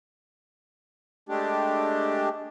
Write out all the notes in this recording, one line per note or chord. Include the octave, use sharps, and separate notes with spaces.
G#3 A3 D4 G4